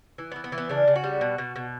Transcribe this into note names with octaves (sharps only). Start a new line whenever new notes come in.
E3
B3
E3
B3
E3
B3
C#3 D4
C#3
F#4
G3
B2
B2
B2